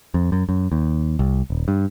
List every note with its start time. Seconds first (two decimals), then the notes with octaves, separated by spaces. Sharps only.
0.14 F2
0.32 F#2
0.49 F#2
0.72 D#2
1.19 C2
1.50 D#1
1.68 G2